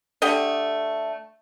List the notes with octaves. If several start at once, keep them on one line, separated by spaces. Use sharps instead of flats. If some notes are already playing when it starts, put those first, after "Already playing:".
D3 A3 G4 D#5